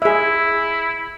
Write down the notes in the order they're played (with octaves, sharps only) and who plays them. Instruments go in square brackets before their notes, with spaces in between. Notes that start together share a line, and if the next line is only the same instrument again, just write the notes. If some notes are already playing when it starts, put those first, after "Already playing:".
[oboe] E4 [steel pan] G#4 E5